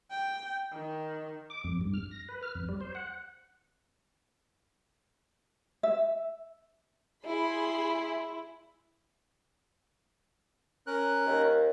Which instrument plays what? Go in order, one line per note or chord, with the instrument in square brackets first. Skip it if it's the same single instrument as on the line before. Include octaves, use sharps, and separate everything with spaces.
[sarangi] G5
D#3
[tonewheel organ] D6
F2
G2
F6
A#6
B4
F6
F2
G3
C5
F#5
[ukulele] E5
[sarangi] E4 [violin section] G#4 B5 C6
[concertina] C#4 A#4 F#6
[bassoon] D#2